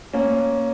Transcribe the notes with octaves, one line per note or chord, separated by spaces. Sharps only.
A#3 C#4